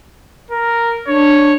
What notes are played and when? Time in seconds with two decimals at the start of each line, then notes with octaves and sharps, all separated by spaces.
0.51 A#4
1.07 D4 C#5